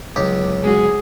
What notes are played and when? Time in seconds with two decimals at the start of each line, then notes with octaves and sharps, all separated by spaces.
0.16 G1 C#2 C#3 F#3 G4
0.64 G#3 C#4 F#4 G#4